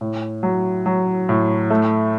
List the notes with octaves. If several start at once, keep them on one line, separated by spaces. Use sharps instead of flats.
A2
F#3
F#3
A2
A3